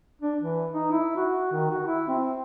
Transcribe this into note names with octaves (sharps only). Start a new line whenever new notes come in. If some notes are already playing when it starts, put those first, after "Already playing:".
D4
E3
D#4
E4
F#4
D#3
F#4
E4
C4